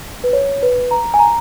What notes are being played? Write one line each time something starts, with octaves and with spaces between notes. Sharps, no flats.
B4
C#5
B4
A#5
G#5
A#5